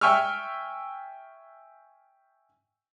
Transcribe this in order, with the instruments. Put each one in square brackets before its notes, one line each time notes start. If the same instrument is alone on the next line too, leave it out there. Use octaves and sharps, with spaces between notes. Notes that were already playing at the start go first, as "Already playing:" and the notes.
[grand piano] E5 G5 G#5 C#6 E6 F6